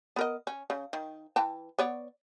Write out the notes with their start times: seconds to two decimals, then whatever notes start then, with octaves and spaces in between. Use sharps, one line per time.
0.16 B3 A#4 D#5
0.47 C#4
0.70 C#3
0.93 D#3
1.36 E3 G5 A5
1.79 B3 C#5 D5